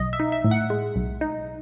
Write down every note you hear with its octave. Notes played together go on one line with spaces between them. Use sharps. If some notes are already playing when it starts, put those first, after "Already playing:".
Already playing: B1 D#5
E5
D#4
E5
A2
F#5
G#3
B1
D#4